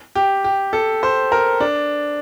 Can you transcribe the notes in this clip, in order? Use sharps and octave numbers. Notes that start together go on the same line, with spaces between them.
G4
G4
A4
C5
A#4
D4